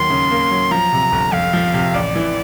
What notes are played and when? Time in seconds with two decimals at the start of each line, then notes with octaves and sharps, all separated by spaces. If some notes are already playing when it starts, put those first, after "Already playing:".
Already playing: D#2 F#3 A#3 C6
0.10 C#3
0.31 A#3
0.51 F#3
0.71 F3 A#5
0.93 C3
1.12 G1
1.32 F2 F5
1.53 F3
1.74 C3
1.94 A1 D5
2.16 E3